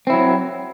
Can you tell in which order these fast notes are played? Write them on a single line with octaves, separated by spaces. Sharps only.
C4 E4 F#3